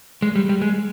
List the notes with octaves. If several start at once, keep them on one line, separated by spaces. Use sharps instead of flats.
G#3
G3
G3
G#3